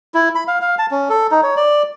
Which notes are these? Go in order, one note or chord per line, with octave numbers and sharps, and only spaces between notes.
E4
B5
F5
F5
A5
C#4
A4
D#4
C#5
D5